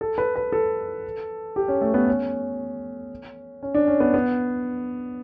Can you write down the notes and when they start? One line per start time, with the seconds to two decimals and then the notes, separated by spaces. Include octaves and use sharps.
0.01 A4
0.18 B4
0.36 B4
0.52 A4
1.56 G4
1.68 C#4
1.81 A3
1.94 B3
2.08 C#4
3.63 C#4
3.74 D4
3.87 C#4
4.00 B3
4.14 B3